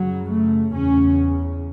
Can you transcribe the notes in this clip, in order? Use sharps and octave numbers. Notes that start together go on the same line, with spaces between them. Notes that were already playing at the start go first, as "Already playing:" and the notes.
Already playing: F#2 C#3 F#3
A3
E2 C#3 C#4